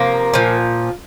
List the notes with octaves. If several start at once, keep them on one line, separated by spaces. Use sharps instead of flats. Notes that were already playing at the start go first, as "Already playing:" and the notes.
Already playing: C3 F3 A#3
A#2 F3